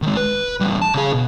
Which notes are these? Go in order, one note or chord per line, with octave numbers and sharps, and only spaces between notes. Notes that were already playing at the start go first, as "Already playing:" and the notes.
D#3 G#3
B4
E2 G3
A5
C#3 G#4
B2